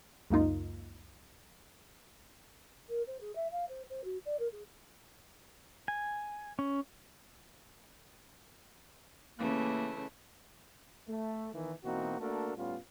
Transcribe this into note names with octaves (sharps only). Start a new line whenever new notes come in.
C#2 F#2 A#3 D#4 F4
A#4
C5
G#4
E5
F5
C5
C5
F#4
D5
A#4
G#4
G#5
C#4
C#3 E3 A3 A#3
A3
E2 D#3 E3
B2 E3 A#3 C4 D#4 F#4
A3 A#3 D4 F#4 A4 A#4
A2 G3 B3 C#4 F4